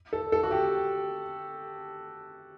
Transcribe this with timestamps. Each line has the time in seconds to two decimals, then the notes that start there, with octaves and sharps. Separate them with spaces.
0.13 A4
0.32 A4
0.43 F#4
0.51 G4